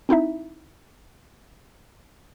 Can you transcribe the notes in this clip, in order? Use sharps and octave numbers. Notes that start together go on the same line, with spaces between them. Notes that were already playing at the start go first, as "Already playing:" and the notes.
C4 D#4 E4 E5